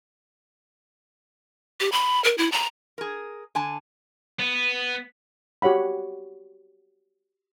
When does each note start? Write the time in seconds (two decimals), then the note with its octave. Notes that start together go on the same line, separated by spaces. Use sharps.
1.80 G4
1.92 B5
2.24 A#4
2.38 E4
2.52 A#5
2.98 G#4 A#4
3.55 D3 G#5 A5
4.39 B3
5.62 F#4 G4 C#5 F#5 B5